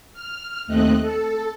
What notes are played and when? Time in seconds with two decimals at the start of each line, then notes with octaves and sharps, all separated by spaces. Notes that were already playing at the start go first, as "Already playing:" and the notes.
0.13 F6
0.67 D#2 A3 C4 D#5 F#6
1.00 A4